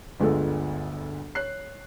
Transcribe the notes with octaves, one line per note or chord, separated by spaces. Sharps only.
G1 D2 G#3 F4 A4
C#5 F#6 C7